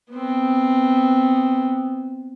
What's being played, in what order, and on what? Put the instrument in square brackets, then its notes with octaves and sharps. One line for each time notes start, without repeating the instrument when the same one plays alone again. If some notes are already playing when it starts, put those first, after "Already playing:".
[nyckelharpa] B3 C4